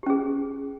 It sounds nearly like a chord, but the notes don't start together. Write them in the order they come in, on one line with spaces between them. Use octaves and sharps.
G4 C#4 G#4